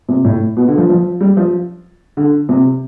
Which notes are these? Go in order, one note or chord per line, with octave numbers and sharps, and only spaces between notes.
C3
A2
B2
D3
F3
F3
G3
F3
D3
C3